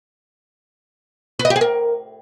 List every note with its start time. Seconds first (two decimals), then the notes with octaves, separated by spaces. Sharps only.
1.39 B4
1.45 D#5
1.50 G4
1.56 G#4
1.61 A#4